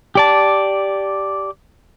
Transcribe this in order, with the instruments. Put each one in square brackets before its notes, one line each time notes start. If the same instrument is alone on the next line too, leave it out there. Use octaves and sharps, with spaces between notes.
[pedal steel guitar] G4 D5 A5